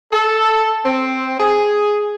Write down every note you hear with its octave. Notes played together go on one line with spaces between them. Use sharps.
A4
C4
G#4